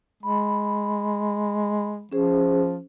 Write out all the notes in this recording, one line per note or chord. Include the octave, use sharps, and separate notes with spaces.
G#3 B5
F3 C#4 G#4 C5